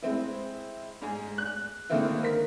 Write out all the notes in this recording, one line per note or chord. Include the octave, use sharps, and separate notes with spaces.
G#3 C4 E4
G#2 G#3 G#4
F#6
D3 D#3 G#3 A#3 C4 E4
A#4 B6